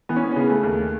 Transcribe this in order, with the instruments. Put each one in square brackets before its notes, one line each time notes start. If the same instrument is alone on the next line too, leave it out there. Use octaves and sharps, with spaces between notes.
[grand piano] E3 B3
C#4
B3
C#4
C#3 B3
A3
D#2